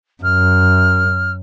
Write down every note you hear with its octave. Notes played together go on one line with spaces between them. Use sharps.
F#2 F6